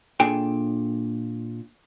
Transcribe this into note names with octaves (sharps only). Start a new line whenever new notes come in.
A#2 D4 G#4 A4 G5 G#5